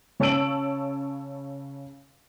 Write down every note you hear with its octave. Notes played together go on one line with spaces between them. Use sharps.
C#3 C#5 A5 E6 D7 F#7